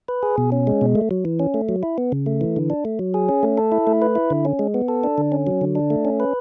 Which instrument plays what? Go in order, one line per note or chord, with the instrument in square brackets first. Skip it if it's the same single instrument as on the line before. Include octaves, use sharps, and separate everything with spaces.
[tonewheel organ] B4
G#4
B2
C#4
G#3
B2
A3
F#3
E3
C#4
A3
F#3
E4
B3
C#3
A3
E3
D3
D4
A3
F#3
G#4
C#4
A3
A4
E4
A3
B4
E4
D3
C#4
G#3
B3
A4
D4
D3
C#4
F#3
D3
D4
A3
C#4
B4